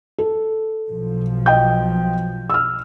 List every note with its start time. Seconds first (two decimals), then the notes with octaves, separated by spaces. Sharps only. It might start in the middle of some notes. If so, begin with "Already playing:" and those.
0.18 A4
0.89 B1 B2 F3
1.46 D#5 G5 G6
2.50 E6 F6